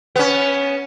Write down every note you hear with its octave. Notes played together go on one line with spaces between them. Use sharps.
B3 C#4